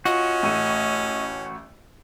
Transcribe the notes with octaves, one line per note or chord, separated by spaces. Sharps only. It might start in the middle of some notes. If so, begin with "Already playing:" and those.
C#4 F4 F#4 D#5
A1 A3 D#7